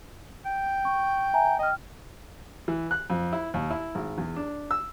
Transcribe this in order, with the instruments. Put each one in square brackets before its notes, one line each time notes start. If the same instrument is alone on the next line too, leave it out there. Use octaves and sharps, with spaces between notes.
[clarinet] G5
[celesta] C#6
E5 G#5 A#5
[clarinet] D#5 [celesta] G5 F6
[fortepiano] E3
F#6
F2
E4
D#2
E4
G#1
E2
D4
E6